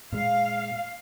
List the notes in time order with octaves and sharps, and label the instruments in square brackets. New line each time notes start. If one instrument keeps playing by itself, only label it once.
[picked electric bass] A#2 G#3 [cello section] F5